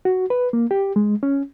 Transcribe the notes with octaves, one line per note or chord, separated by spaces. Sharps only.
F#4
B4
A#3
G4
G#3
C#4